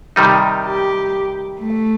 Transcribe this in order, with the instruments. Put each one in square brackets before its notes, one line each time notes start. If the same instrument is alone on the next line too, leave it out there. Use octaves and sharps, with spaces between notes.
[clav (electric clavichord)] C3 D#3 G3 D#4
[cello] G4
A3